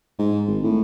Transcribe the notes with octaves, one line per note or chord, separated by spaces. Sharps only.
G#2
G#1
A2